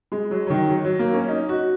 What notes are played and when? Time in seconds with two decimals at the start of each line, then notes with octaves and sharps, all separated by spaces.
0.12 G#3
0.31 F#3
0.47 F#3
0.50 D#3
0.69 F#3
0.85 F#3
0.99 A#3
1.13 C#4
1.28 D#4
1.49 F#4